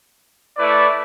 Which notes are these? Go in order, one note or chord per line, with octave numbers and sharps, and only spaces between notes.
A3 E4 B4 D5